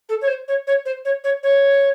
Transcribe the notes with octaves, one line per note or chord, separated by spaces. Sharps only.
A4
C#5
C5
C#5
C#5
C5
C#5
C#5
C#5